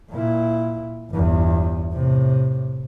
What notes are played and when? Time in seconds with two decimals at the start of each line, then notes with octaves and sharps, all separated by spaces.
0.11 A#2 E4
1.11 G1 E2
1.93 A2 C3